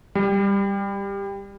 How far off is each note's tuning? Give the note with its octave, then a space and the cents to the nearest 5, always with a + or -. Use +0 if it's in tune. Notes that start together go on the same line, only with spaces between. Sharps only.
G3 +15